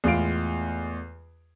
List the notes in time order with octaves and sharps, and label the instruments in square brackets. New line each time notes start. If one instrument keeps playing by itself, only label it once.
[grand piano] E2 A2 G#3 F4 F5 D7